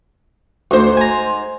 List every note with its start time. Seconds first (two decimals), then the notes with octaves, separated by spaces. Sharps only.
0.71 D2 G#2 C5
0.97 G#5 A#5